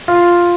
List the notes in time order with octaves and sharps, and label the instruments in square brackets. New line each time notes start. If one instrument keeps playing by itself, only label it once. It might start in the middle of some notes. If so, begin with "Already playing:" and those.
[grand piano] F4